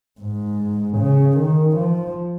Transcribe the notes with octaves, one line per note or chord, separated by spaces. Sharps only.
G#2
C#3
D#3
F3